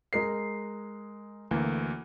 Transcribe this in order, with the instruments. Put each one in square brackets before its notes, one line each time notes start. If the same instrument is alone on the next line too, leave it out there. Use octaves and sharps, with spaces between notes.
[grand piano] G#3 A#4 C7
[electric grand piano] D2 E3 A#3